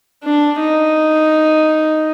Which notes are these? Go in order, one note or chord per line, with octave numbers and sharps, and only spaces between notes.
D4
D#4